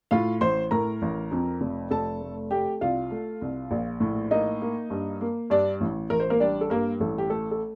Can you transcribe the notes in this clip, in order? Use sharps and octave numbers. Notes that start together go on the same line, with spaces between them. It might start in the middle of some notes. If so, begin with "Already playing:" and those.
A2 F4 F5
A1 C5 C6
A2 A#4 A#5
A1
F2
F1
F1 A4 A5
A3
A3 G4 G5
C2 F4 F5
A3
C2
A#1
A2
A#3 D#4 D#5
A#3
G2
A#3
G2 D4 D5
A1
A1 A#4
C5
A#3 A#4
G3 D4 D5
A4
G2 A#3 A#4
A1 A4
G4
A3 A4
A4